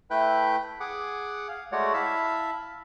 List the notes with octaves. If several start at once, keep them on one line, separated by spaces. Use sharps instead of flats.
A3 E4 B4 G5 F#6
G#4 F#5 D6
F5
G#3 A3 F#4 C#5 D5 F#5
E4 E5 F5 A5 B5